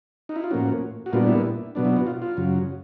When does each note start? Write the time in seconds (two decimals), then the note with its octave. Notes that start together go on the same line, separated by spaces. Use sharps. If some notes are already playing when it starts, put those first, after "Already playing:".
0.29 D#4
0.36 E4
0.44 F4
0.51 A2 F3 A#3 C#4 F#4
1.06 F#4
1.13 A#2 G3 B3 D4 F4
1.28 E4
1.75 B2 F#3 B3 D4
1.85 E4
1.96 F#4
2.07 F4
2.22 F4
2.37 F#2 C#3 F#3